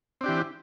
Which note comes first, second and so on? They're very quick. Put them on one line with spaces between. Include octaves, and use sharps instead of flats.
C4 D4 G4 E3